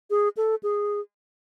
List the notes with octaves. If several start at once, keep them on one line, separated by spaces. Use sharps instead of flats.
G#4
A4
G#4